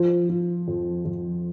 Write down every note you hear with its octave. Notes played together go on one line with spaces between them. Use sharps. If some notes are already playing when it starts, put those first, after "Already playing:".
Already playing: F3
F3
F2
F2